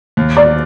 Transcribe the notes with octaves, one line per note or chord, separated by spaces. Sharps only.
D#2
D5